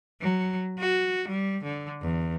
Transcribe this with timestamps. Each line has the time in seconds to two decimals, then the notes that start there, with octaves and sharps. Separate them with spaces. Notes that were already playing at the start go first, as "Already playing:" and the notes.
0.21 F#3
0.79 F#4
1.28 G3
1.64 D3
2.02 E2